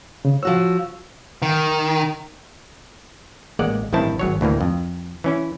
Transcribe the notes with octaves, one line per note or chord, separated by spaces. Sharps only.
C#3
F3 F#4 C#5 E6
D#3
A1 G#3 A#3 D5 F#5
A1 G2 D#3 C4 E4 A5
G#1 F#3 C#5
D2 A2 E3 A#3
F2
E3 C#4 E4